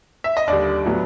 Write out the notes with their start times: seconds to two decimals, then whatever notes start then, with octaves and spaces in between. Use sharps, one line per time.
0.24 E5
0.37 D#5
0.47 D#2 D3 G3 D4 D5
0.85 A2 F#3 B3